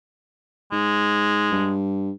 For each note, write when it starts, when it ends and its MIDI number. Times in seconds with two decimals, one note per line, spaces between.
0.72 1.48 44
0.72 1.75 56
1.52 2.11 43